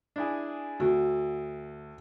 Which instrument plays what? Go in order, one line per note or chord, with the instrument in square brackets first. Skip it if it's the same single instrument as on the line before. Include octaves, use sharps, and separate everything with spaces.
[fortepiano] D4 E4 G#4
[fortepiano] D2 [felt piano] F#4